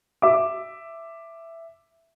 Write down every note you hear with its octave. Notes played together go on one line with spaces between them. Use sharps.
E5 D6